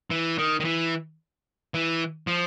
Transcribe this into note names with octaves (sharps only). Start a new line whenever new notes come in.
E3
D#3
D#3
E3
E3
F3